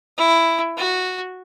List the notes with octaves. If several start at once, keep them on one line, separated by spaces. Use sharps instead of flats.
E4
F#4